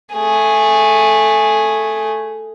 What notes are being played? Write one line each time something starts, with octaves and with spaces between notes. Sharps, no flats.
A3 G#4